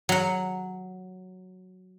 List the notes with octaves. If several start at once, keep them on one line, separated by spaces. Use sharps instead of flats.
F#3 F#5